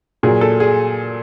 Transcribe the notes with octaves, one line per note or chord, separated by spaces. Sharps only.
A#2 F#3 G#4
A4
G#4